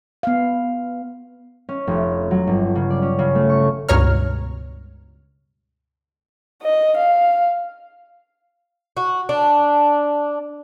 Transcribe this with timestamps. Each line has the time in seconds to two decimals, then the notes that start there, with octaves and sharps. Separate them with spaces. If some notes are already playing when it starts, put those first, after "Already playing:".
0.23 B3 F5
1.69 C#4
1.87 F1
2.31 F#3
2.47 G1
2.75 C#3
2.90 D5
3.02 C#4
3.19 C#3
3.35 A3
3.50 C#6
3.89 C#2 G2 B2 C#5 A#5 F6
6.63 D#5
6.97 F5
8.97 F#4
9.29 D4